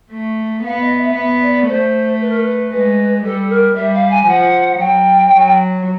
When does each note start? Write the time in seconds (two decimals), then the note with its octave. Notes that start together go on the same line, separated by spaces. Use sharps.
0.11 A3
0.63 B3 F5
0.80 D#5
0.97 E5
1.15 B3 E5
1.41 D5
1.67 A3 C5
2.20 B4
2.29 A#4
2.39 B4
2.71 G#3 B4
3.23 G3 A4
3.49 A#4
3.75 G3 E5
3.94 F5
4.10 G#5
4.27 F3 F#5
4.79 F#3 G5
5.32 F#3